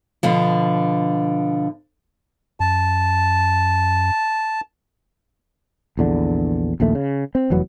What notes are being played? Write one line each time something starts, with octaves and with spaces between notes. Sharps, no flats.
B2 D3 F3
F#2 A5
A#1 E2 D3
A#1 D#2 A#2 A3
C#3
C4
F1 E2 F#3 B3